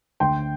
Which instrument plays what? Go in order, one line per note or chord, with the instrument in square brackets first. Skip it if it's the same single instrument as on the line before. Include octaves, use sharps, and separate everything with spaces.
[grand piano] D2 G5 C6